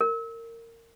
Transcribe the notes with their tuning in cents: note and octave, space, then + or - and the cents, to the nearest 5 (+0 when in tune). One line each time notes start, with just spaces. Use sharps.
A#4 -25